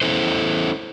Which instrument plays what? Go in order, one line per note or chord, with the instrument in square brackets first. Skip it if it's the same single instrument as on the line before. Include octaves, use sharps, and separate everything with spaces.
[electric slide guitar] C#4 E4 A4 C5